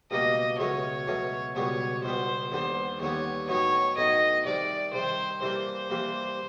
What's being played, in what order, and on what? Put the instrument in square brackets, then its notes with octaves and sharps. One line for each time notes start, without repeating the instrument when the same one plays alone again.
[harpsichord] C#2 B2 G3 A#3 [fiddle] D#5
[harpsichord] C#2 B2 F#3 A3 C#4 [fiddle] C#5
[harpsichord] C#2 B2 F#3 A3 C#4
[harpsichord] C#2 B2 G3 B3 [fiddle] C#5
[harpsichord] C#2 B2 G3 B3 [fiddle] C5
[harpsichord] D#2 D3 G3 B3 [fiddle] C5
[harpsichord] D#2 D3 G3 B3 [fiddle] C#5
[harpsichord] A2 F#3 B3 D#4 [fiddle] C#5
[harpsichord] A2 F#3 B3 D#4 [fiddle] D#5
[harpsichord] C2 C3 D#3 [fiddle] D5
[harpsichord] C2 C3 D#3 [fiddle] C5
[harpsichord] C3 E3 G3 A#3 [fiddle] C5
[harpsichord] C3 E3 G3 A#3